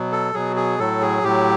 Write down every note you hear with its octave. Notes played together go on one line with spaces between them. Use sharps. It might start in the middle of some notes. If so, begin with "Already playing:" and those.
Already playing: B2 F#3
A4
B2 F#3 G#4
G#4
A2 F#3 A4
G#4
A2 F#3 G4